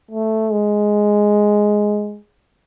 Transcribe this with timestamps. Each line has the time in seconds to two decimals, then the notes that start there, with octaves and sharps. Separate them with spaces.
0.11 A3
0.52 G#3